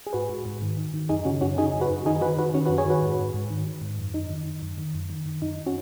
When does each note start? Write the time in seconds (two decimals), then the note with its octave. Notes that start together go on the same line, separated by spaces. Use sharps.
0.07 G#4
0.13 G#2 F#4 B4
0.30 G#2
0.45 G#2
0.62 D#3
0.77 D#3
0.94 D#3
1.09 F#2 D#4 G#4
1.25 C#3 C#4 F#4
1.41 F#2 C#4 F#4
1.57 C#3 D#4 G#4
1.74 F#2
1.81 F#4 B4
1.90 F#2
2.05 D#3 D#4 G#4
2.21 D#3 F#4 B4
2.37 D#3 F#4 B4
2.54 D#3 C#4 F#4
2.65 F#4 B4
2.69 F#2
2.78 G#4 C#5
2.86 D#3 F#4 B4
3.02 G#2
3.19 G#2
3.34 G#2
3.50 D#3
3.67 D#3
3.82 G#2
3.99 F#2
4.14 F#2 D#4
4.30 D#3
4.46 D#3
4.62 F#2
4.78 D#3
4.95 F#2
5.10 D#3
5.26 D#3
5.42 F#2 D#4
5.66 C#4 F#4